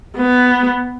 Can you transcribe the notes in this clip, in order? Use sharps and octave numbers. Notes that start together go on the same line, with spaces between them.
B3